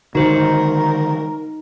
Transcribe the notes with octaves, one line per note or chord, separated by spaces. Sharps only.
D3 D#3 G#3 D#4 F#4 A#4 C5